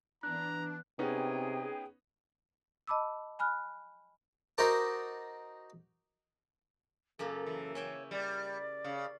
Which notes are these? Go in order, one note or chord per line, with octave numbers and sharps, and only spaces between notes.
E3 B3 D4 A#5 F#6
C3 B3 C#4 D#4 G#4 G5
D#5 A5 B5 D6 E6
G#5 B5 F6 F#6
D#4 F#4 A#4 C5 A5 D6
F#2 C#3 A#3 A4
E3
C#4 C#5 E5 G5
G3 D5
C#3